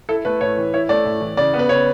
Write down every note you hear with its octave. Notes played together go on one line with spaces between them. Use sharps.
E4 A4
A3 B4
A2 C#5
E3
E4 C#5
A3 D5
A2
E3
C#3 D5
B3
B4
C#3 C#5